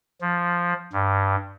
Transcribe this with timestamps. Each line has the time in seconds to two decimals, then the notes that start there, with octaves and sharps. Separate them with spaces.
0.21 F3
0.93 G2